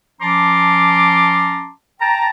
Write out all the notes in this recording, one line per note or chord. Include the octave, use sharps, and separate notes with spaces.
F3 C#4 A5 A#5 C6 D6
G5 A5 A#5